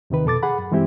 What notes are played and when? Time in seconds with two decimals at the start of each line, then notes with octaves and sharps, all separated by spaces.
0.10 D#2 C3 D#3 B4
0.25 F2 B2 A4 D6 A6
0.43 G#4 F#5 B5
0.59 F#2
0.71 G2 E3 G#3 C4 E4 G4